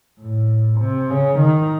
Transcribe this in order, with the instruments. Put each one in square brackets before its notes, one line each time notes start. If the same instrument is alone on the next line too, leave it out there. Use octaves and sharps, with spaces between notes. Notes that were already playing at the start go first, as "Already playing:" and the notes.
[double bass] A2
C3
C#3
D#3